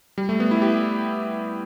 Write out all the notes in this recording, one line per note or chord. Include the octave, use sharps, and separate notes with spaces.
G3
A3
B3
E4
G4